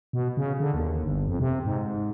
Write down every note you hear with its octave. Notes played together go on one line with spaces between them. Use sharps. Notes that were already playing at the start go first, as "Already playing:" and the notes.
B2
C#3
D3
D#2
G1
F2
C3
G#2